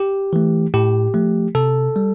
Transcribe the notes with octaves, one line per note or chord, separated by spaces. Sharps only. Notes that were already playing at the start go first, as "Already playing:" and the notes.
Already playing: G4
E3 A3
A2 G4
F3 A3
C3 A4
G3